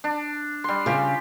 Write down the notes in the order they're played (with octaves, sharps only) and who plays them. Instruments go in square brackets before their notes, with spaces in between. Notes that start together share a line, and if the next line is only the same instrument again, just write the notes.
[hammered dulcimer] D4
G3 C6
[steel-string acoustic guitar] C#3 [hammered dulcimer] F4 G4